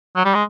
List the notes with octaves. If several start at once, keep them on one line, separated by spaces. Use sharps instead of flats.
F#3
G3
G#3